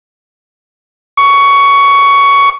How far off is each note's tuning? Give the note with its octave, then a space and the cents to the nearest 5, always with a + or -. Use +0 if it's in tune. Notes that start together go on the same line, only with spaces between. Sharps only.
C#6 +15